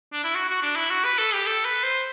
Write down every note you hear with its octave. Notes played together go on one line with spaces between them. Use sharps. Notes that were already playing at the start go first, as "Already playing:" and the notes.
D4
E4
F#4
F#4
D4
E4
F#4
B4
A4
G4
A4
B4
C5